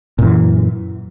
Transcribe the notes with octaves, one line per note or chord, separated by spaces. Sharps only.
F#2 A#2 E3